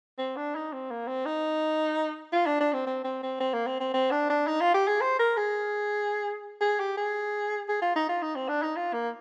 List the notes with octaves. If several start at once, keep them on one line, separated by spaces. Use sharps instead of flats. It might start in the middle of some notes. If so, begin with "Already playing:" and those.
C4
D4
D#4
C4
A#3
C4
D#4
F4
D4
D4
C4
C4
C4
C4
C4
A#3
C4
C4
C4
D4
D4
D#4
F4
G4
G#4
C5
A#4
G#4
G#4
G4
G#4
G#4
F4
D#4
F4
D#4
C4
D4
D#4
F4
A#3